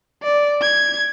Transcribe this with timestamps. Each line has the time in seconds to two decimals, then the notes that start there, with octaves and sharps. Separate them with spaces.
0.23 D5
0.62 G#6